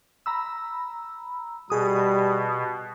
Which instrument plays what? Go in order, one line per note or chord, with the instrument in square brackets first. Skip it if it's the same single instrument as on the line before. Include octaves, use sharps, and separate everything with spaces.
[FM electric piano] A#5 B5 E6
[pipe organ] B2 [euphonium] G3 [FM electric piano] G#4 D#6